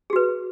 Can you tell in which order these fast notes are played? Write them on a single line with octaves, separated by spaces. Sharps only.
G#4 F#4 B4